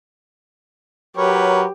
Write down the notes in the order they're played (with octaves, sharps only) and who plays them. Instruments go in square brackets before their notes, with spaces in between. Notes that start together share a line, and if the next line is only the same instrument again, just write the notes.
[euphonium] F#3 [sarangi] G4 [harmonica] A#4 B4 C#5